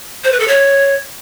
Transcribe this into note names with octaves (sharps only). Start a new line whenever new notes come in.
C5
B4
A4
C#5